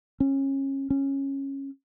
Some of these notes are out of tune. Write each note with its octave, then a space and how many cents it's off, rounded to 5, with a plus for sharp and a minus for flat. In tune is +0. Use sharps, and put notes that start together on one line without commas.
C#4 -25
C#4 -15